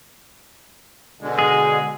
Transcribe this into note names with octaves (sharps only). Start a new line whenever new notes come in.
B2 D3 G#3
G#4